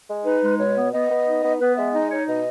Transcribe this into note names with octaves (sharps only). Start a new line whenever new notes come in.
G#3
D#4 B4
G#3
B2 C#5
B3
B3 D#5
B3
D#4
B3
B3 B4
G#3 E5
D#4 D#5
D#4 C#5
B2 D#5